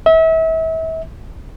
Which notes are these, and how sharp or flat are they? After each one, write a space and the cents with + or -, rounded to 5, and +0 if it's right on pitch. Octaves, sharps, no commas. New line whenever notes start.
E5 -35